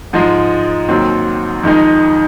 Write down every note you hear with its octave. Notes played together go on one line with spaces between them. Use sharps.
G#2 F3 G#3
D#2 D#3 F#3 C4
F2 D#3 G#3 D#4